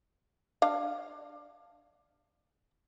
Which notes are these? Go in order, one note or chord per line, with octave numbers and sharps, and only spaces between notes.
D4 F5